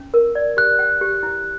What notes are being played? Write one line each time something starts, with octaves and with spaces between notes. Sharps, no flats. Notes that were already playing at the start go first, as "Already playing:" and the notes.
Already playing: C#4
A#4
D5
G4 F#6
G5
G4
E4